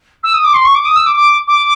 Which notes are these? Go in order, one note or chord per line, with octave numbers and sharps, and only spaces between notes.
E6
D#6
D6
C6
C#6
D6
D#6
E6
D6
D6
D6